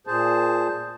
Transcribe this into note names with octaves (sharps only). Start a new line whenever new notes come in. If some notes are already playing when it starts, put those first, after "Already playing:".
A#2 G#4 C5 A5